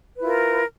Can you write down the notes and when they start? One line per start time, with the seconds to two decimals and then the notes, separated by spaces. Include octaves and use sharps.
0.17 B4
0.19 E4
0.22 F4
0.25 A#4